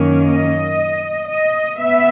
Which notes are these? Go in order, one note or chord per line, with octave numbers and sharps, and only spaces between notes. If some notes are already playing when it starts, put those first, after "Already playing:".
Already playing: F#2 D#3 A#3 C#4
D#5
D#5
B3 E5